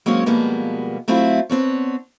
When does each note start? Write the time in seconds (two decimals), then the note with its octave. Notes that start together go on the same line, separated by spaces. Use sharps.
0.06 F#3 G#3 A#3 C4 C#4 C#5
0.26 B2 F3 G3 G#3 A#3 B3
1.08 F#3 A3 C4 E4 F4
1.50 B3 C4 D4 C#5